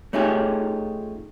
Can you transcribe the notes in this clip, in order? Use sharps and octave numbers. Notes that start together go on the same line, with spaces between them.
A3 C#4 D#4 F4 G4 G#4